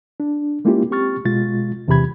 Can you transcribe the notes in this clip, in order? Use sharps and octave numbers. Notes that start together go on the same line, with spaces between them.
D4
G#3 A#3 C#4 E4 F4 G4
C4 G4 C#6 F6 A6
B2 G#3 F4 A6
E2 C3 E3 G4 B5 G#6